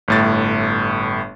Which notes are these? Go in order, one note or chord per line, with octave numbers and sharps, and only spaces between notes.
G1 A2 A6